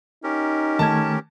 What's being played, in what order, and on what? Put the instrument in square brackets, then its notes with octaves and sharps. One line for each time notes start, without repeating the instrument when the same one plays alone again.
[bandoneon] C#4 G4 A#4 [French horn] D#4
[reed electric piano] D#3 A3 G#6 [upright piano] A5